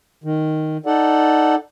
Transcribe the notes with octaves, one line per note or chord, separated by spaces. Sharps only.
D#3
D#4 A4 D5 F#5